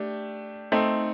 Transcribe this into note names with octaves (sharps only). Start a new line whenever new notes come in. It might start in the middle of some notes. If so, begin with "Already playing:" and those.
Already playing: A3 D4 G4
A3 C4 D#4